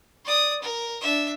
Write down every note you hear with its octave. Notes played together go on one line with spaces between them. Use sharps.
D5 D#6
A#4
D4 E5